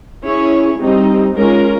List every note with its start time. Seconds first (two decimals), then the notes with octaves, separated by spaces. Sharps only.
0.24 C#4 E4 G#4 C#5
0.79 G3 C4 D#4
1.35 G#3 C#4 F4 A#4